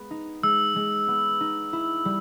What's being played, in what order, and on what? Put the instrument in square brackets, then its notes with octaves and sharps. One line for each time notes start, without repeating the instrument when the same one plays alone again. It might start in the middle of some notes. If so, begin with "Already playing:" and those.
Already playing: [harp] G#3 B3
D#4
[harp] G#3 [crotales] E6
[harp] G#3
B3
D#4
E4
G3